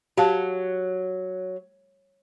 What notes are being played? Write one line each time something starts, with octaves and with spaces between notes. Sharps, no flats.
F#3 G4 F5 A5